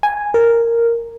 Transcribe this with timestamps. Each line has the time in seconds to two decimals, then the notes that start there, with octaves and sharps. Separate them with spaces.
0.03 G#5
0.34 A#4